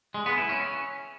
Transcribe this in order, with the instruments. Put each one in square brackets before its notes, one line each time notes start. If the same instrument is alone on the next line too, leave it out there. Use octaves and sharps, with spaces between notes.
[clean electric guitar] G#3
B3
E4
C#4